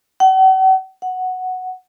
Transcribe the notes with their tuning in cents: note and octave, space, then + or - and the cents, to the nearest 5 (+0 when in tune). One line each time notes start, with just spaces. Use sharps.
F#5 +45
F#5 +0